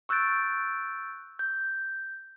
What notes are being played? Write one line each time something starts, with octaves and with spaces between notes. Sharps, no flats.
C#6 E6 F#6 G6 A6 D7
G6